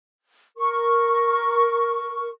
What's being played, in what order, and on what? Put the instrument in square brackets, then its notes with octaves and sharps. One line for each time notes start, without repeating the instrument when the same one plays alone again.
[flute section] A#4 C#6